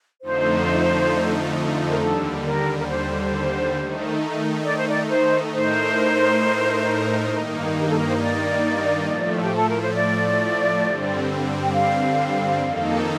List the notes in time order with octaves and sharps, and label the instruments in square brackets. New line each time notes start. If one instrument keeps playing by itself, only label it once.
[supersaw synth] F2 D3 F3 A3 D#4 [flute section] C5
[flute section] A#4
[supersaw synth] D#2 D3 G3 [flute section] A4
[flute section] A#4
A#4
C5
[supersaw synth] D#3 A3 D#4
[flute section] D5
C5
D5
C5
[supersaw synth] A2 A3 D#4 A#4 [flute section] C5
[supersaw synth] G2 D#3 A#3 D#4
[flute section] G4
A4
A#4
C5
D5
[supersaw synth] A2 F3 A3
[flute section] G4
A4
A#4
C5
D5
[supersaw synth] G2 D3 G3 C4
[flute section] G5
F5
[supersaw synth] F2 D#3 A#3 D#4 A4